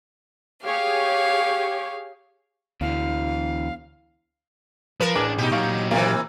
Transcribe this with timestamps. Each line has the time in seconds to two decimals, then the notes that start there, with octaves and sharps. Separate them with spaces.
0.64 G4 G#4 C#5 F5
2.81 D2 B2 E3 F5
5.00 F3 A#4 B4 E7
5.15 A1 D4 G#4 D5 D6
5.38 B2 D#4 G4
5.52 A#2 F#3 F5 C#6
5.91 C3 E3 A#3 F4